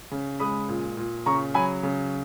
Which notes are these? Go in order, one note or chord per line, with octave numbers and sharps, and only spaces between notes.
C#3
G#3 B5 D#6
A#2
A#2
C#3 A#5 C#6
F#3 G#5 B5
C#3